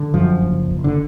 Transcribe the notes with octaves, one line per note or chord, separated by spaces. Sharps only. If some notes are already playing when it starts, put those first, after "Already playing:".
Already playing: D3
F#2 F3
F#1
F#1
D3